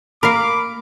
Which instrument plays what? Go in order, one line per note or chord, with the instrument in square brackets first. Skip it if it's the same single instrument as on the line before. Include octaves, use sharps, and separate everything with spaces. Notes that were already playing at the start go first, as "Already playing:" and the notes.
[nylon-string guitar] A#3 [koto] A#4 F5 [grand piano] B5 [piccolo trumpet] D6